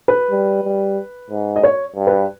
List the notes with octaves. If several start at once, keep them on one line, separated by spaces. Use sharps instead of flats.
B4
G3
G3
G#2
D#5
C#5
G2
B4